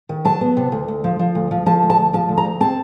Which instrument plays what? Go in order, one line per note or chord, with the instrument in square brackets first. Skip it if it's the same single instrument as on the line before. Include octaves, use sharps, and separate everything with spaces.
[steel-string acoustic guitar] D#3
F#3 A5
B3
C3
D2
D2
F3
F3
D2
F3
F3 A5
D2
A5
D2
F3 A5
D2
A#5
D2
C4 A5